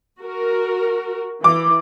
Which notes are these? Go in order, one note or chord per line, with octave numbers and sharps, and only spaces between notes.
F#4 A#4
E3 D6